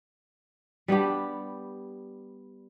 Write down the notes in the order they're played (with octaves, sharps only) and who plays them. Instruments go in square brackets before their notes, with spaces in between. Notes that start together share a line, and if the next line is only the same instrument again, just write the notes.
[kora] G3 B3 D4 G4